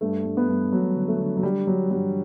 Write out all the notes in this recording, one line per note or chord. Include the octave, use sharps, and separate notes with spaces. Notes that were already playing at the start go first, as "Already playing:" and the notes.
G2 A3
G2
B3
G2
G2 F#3
D3
A3
D3
F#3
D3 G3
D3 F#3
G2 F#3